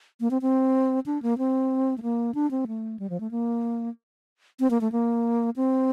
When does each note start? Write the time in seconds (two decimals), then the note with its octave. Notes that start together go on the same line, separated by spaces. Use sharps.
0.20 A#3
0.31 C4
0.42 C4
1.06 D4
1.22 A#3
1.38 C4
1.98 A3
2.02 A#3
2.35 D4
2.51 C4
2.67 A3
2.99 G3
3.10 F3
3.20 A3
3.31 A#3
4.60 C4
4.71 A#3
4.81 A3
4.92 A#3
5.56 C4